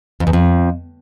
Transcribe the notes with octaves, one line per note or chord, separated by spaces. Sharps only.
F2
E2
F2